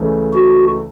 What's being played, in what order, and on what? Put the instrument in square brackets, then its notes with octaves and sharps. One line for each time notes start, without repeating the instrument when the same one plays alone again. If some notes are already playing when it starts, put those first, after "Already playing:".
Already playing: [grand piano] C#2 C#3 E3 A3
[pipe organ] F#4